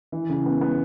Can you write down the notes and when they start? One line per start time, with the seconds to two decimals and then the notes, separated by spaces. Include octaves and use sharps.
0.12 E3
0.29 C#3
0.46 B3
0.61 B3